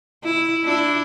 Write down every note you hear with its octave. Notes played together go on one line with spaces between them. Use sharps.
E4
D4 E4